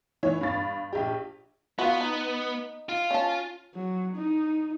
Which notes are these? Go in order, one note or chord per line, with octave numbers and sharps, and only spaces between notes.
E3 C#5
G2 A6
A#1 G4
B3 F4 F#4
D#4
F4
C#4 A5
F#3
D#4